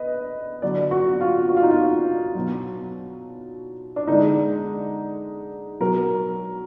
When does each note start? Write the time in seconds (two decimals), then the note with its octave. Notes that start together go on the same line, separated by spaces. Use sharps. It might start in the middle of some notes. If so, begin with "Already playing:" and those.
Already playing: B4 D#5
0.62 D3 F#3 D5
0.91 F#4
1.20 F4
1.49 F#4
1.56 F4
1.63 D#4
1.70 F4
2.35 B2 F#3
3.96 D4
4.07 D3 G#3 D#4
5.80 B2 F#3 A#4